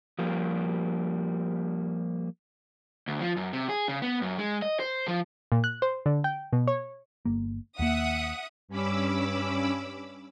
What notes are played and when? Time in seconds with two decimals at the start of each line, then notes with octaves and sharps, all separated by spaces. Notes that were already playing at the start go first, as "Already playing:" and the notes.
0.19 F3 G3 A#3 G4
3.08 D2
3.21 F3
3.37 F#2
3.53 C3
3.69 G#4
3.88 C#3
4.02 B3
4.22 F#2
4.39 G#3
4.62 D#5
4.80 C5
5.08 F3
5.52 A#2
5.64 F#6
5.82 C5
6.06 D3
6.24 G5
6.53 B2
6.68 C#5
7.25 G1 A#3
7.79 D#2 A#3 E5 F#5 D#6
8.68 G2 C#4 B5 D6 E6